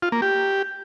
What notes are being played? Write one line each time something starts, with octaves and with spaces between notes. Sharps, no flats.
F4
A#3
G4